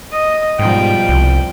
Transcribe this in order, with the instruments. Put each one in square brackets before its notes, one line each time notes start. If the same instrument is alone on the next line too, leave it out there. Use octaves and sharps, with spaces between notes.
[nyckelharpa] D#5
[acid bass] G#2 [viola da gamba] B2 F3 G3 [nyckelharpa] G5
[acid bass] C2